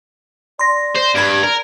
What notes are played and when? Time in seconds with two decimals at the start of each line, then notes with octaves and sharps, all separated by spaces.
0.59 D5 C6 A#6
0.95 C5
1.15 G2 B5 G#6 D7
1.43 A#4